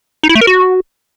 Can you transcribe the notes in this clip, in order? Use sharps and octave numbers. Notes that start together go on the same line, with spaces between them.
D#4
E4
A3
A#4
F#4